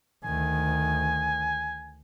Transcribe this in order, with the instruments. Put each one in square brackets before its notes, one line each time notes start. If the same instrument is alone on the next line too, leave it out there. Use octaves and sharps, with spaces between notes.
[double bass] D2 D#3 [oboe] G#5